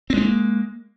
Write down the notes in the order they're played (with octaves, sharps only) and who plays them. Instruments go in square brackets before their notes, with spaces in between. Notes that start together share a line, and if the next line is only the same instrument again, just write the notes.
[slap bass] C4
G#3
D4
A#3